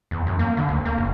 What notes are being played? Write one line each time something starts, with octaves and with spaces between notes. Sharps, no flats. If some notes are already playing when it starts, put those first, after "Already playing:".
E2
F#2
A#3
D3
D2
A#3
F#1